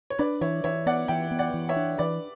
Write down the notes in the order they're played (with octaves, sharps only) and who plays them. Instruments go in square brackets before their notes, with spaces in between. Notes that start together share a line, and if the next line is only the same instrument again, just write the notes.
[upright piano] C#5
[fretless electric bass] D4 [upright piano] B4 D5
[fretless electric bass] E3 [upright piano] C#5 E5
[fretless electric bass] E3 [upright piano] C#5 E5
[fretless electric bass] B3 [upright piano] D5 F#5
[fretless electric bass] E3 [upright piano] E5 G5
[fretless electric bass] B3
[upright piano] D5 F#5
[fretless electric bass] E3
[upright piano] C#5 E5
[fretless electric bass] D4
[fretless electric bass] E3 [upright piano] B4 D5